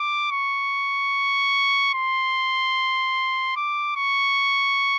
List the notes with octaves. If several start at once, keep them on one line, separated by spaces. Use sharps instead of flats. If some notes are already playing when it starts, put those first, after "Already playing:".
Already playing: D6
C#6
C6
D6
C#6